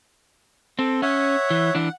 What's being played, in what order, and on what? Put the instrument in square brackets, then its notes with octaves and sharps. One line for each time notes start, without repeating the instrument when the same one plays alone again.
[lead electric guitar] C4 [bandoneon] A4
[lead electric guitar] C#4 [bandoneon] C#5 E5 F#5
[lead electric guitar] E3
[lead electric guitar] E3 D4 [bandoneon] F#5